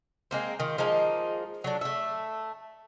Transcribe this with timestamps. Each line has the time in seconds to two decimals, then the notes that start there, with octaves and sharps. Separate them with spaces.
0.31 G#3 A#3 C4
0.60 D#3 F4
0.78 F3 G#3 A#3 D#4
1.64 F#3 A3 D4
1.81 A3 E5